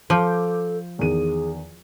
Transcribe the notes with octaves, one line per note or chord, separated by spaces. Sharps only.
F3 A4 D6 G6
E2 D#3 G#4 D#7